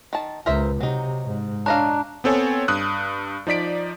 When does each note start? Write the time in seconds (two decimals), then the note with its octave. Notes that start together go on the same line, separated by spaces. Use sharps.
0.13 D#3 A5
0.46 C#2 A#4 C5 E5
0.81 C3 F#3 D#4
1.25 G#2
1.66 D4 C#5 D#5 F5 A5 A#5 F#6
2.24 B3 C4 A4 C#5 G#5
2.68 G2 D#6 F#6
3.47 F3 D#4 D5 B6 D7